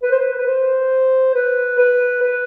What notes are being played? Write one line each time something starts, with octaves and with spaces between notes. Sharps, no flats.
B4
C5
B4
B4
C5
B4
B4
B4